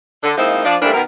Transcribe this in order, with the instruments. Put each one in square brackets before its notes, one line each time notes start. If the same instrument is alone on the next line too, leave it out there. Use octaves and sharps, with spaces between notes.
[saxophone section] D3
F3 G#3 A#3 C4 D#4 E4
F3 D4
E3 G3 A3 A#3 C4 D4
B2 D#3 B3 A#4